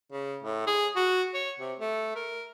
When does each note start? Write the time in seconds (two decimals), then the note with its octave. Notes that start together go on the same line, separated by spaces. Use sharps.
0.12 C#3
0.43 A2
0.67 G#4
0.96 F#4
1.34 C#5
1.59 C3
1.80 A3
2.16 A#4